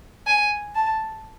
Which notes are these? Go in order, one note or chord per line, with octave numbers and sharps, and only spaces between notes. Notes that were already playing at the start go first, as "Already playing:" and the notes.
G#5
A5